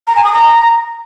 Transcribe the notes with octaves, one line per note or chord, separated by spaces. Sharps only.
A#5
G#5
D#6
A#5